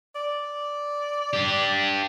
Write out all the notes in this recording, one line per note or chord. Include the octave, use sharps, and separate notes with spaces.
D5
D4 G4